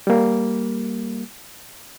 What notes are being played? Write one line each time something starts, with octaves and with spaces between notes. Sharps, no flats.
G3 A#3